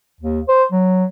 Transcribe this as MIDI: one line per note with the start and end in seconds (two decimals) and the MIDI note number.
0.20 0.40 39
0.49 0.64 72
0.72 1.05 54